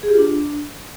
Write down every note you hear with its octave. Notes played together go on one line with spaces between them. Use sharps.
G#4
G4
F4
D4